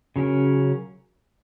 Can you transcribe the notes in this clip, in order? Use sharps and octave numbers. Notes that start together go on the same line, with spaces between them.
C#3 F#3 C#4 A#4